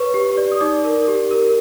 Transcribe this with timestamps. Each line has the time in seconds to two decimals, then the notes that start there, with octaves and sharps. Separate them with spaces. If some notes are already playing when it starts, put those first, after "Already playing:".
Already playing: B4 C#5 C#6
0.14 G4
0.37 D5
0.52 D#6
0.61 D#4 D5 D6
0.85 A#4
1.08 G4
1.31 A#4